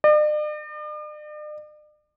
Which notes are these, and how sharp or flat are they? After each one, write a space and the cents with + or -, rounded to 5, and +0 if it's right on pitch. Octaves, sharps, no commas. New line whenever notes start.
D5 +45